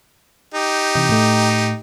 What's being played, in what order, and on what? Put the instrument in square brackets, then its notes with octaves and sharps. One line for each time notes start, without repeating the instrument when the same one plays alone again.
[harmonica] D#4 G4
[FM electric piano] C3 E3 D#5
A2 A3